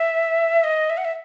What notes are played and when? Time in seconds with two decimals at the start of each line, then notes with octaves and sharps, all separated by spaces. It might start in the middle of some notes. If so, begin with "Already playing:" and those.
Already playing: E5
0.64 D#5
0.90 E5
0.97 F#5
1.05 E5